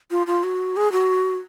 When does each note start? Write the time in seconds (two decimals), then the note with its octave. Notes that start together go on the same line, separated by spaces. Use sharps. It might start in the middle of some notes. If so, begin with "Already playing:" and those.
0.11 F4
0.27 F4
0.44 F#4
0.77 G#4
0.92 F#4